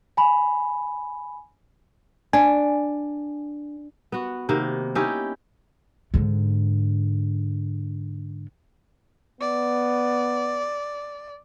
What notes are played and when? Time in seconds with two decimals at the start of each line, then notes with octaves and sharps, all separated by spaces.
0.17 G#5 B5
2.33 D4 G#5
4.12 B3 F#4
4.49 C3 D#3 A#3 B3
4.95 C#4 D#4 E4 G4
6.14 G#2 D3
9.41 B3 D5